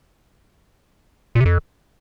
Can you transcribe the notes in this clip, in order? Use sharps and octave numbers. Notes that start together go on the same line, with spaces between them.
A#2
C3
F2